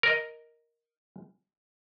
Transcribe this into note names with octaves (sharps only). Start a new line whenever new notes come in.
A#4 D#5